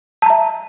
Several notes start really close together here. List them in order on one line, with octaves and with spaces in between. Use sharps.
A5 A#5 E5